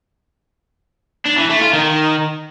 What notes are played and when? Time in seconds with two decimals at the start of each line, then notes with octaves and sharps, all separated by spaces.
1.26 D4
1.38 E3
1.50 A3
1.61 F4
1.73 D#3